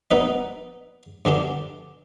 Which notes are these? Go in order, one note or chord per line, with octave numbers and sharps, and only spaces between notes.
G3 B3 D#4 B4 D#5
G2 D3 G3 D4 G4